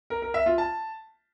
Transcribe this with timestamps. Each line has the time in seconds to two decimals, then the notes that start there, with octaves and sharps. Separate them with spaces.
0.10 A#4
0.22 A#4
0.34 E5
0.46 F4
0.58 A5